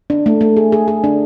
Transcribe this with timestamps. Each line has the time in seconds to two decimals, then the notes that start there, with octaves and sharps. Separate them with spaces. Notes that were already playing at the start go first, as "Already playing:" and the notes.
0.10 D4
0.26 A3
0.41 A3
0.57 G#4
0.72 G#4
0.88 G#4
1.04 D4